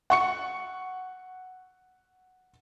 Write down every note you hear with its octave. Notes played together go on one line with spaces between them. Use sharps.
F#5 C#6 C#7